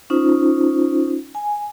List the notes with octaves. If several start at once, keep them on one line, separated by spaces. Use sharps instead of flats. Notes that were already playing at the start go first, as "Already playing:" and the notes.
C#4 D#4 F4 C5
G#5